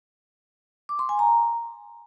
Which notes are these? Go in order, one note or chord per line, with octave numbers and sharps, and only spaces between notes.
D6
C6
G#5
A#5